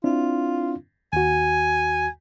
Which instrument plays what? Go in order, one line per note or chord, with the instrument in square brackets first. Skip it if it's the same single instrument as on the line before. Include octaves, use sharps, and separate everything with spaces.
[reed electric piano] C4 D4 E4 [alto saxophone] F4
[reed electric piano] D#2 F#4 [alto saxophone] G#5